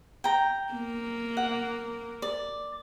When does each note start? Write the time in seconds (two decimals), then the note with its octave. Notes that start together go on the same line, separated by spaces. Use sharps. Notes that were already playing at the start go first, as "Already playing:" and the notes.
0.24 G5 A#5
0.73 A#3
1.37 F#5
2.22 D5